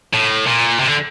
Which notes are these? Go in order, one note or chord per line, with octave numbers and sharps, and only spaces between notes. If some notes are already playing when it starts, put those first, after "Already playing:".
A2
A#2
C3
D3